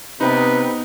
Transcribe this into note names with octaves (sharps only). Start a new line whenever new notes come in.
C3 B3 D#4 B4